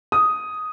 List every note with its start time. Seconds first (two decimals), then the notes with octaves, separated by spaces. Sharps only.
0.12 D#6